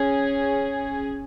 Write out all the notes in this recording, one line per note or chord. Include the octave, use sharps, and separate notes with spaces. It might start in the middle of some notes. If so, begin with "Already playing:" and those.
Already playing: C#4 G#4